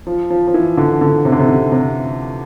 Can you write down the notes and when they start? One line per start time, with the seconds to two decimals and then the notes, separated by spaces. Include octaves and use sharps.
0.07 F3
0.30 F3
0.47 F3
0.54 E3
0.77 D3
1.01 D3
1.25 C3
1.32 D3
1.40 C3
1.49 D3
1.72 C3